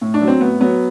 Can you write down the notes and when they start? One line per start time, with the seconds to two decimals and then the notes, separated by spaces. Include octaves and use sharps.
0.01 A2
0.14 D4
0.21 F#3
0.28 C4
0.41 A2 B3
0.60 F#3 B3